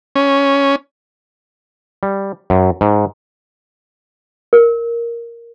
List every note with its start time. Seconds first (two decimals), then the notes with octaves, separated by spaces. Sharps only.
0.16 C#4
2.03 G3
2.50 F#2
2.81 G#2
4.53 A#4